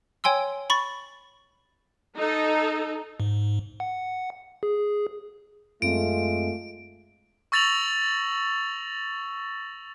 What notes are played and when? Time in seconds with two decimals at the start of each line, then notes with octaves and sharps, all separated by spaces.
0.24 C#5 G5 G#5 C6 E6
0.70 B5 C#6 A6
2.16 D#4 A4
3.20 G#2
3.80 F#5
4.63 G#4
5.82 F#2 G#3 A3 C4 F4 D7
7.52 C#6 E6 A6 A#6 F7 F#7